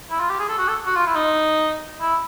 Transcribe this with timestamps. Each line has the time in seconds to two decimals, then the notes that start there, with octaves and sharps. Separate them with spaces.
0.10 E4
0.20 F4
0.30 G4
0.40 G#4
0.48 A4
0.59 F#4
0.68 A4
0.86 F#4
0.96 F4
1.06 E4
1.15 D#4
2.01 E4